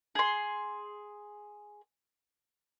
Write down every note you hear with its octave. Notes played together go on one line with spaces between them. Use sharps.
G#4 C6